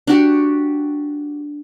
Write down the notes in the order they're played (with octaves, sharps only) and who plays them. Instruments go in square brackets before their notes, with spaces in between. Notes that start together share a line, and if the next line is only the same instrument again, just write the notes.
[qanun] D4 F#4 G4